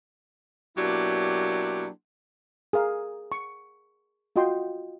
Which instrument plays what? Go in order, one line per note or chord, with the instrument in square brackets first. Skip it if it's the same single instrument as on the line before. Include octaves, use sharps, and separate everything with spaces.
[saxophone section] B2 F#3 A#3 D4 E4 G4
[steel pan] G#4 A#4 F5
C#6
F4 F#4 D#5 G5 C6